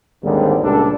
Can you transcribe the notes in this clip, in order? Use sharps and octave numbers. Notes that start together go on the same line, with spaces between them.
G#1 D#2 G#2 D3 D#3 G3
C#2 A#2 G3 D4 A4